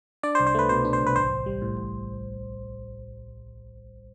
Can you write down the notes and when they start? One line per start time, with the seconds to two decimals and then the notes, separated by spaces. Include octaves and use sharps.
0.23 D4 D5
0.35 C5
0.40 C2
0.47 C5
0.55 A3 B4
0.69 B2 C5
0.85 D4
0.93 C5
1.00 C2
1.07 B4
1.16 A1 C5
1.31 A1
1.46 G3
1.62 A2
1.77 A1